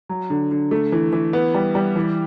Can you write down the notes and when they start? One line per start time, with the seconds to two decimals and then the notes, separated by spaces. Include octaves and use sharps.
0.09 F#3
0.30 D3
0.51 D3
0.71 A3
0.92 E3
1.12 E3
1.33 B3
1.54 G3
1.75 G3
1.96 E3